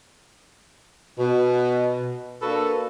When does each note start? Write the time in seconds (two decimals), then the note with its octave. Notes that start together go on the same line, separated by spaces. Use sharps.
1.18 B2
2.42 A#3 D4 F#4 A4 B4